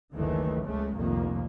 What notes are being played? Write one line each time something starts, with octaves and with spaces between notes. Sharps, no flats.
F#1 D2 D#3 E3 A3
C#2 C#3 G#3 A3
F1 C2 F2 A#2 D#3 A#3